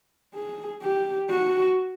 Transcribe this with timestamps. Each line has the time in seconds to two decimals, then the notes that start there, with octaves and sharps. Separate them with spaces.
0.35 G#4
0.82 G4
1.29 F#4